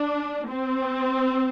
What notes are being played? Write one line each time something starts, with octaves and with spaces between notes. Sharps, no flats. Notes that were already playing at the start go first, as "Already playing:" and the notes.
Already playing: D4
C4